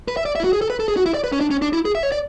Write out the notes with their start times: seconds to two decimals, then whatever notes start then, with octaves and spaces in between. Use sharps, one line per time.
0.08 B4
0.17 E5
0.26 D5
0.36 E5
0.40 E4
0.44 F#4
0.53 G#4
0.61 A4
0.70 B4
0.80 A4
0.88 G#4
0.97 F#4
1.06 E4
1.14 D5
1.24 B4
1.32 C#4
1.41 D4
1.51 C#4
1.62 D4
1.73 E4
1.85 G#4
1.95 E5
2.03 C#5
2.12 D5